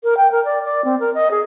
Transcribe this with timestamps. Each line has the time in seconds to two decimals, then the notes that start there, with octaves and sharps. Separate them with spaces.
0.04 A#4
0.17 G5
0.31 A#4
0.45 D5
0.64 D5
0.84 C4
1.00 A#4
1.14 D#5
1.31 G#4